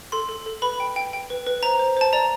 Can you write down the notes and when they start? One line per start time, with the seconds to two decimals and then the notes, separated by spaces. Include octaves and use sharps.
0.12 A4 C6
0.29 A4
0.46 A4
0.62 B4 B5
0.80 G5
0.96 G5
1.13 G5
1.30 B4
1.46 B4
1.63 C5 A#5
1.79 C5
1.97 C5 A5
2.13 D5 A#5